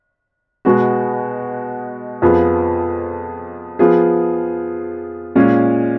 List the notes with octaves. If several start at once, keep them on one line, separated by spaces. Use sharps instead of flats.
B2 G#3 B3 F#4
F2 F3 B3 F4 G#4
F3 B3 F4 G#4
A#2 G#3 C#4 F4